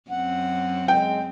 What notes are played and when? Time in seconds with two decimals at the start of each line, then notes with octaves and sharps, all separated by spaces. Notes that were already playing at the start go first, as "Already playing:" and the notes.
0.10 F#2 C4 F#5
0.88 G#3 G5